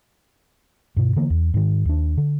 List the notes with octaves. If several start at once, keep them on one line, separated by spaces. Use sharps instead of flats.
G2 B2
D3 E3 A#3
E2
G#2 D#3
D#2 D4
D3